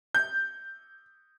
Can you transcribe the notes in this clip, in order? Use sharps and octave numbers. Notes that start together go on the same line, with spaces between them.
G6